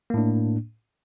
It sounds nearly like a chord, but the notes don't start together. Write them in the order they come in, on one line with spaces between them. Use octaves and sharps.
A#3 A2 D4